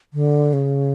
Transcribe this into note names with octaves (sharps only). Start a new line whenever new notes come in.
D3
C#3